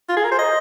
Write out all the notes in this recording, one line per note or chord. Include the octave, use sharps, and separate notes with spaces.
F4
G#4
A#4
C5
D#5